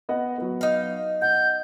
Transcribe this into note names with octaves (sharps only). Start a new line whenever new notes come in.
B3 D#5 F#5
F#3 B3
D#4 F5
F#5 G6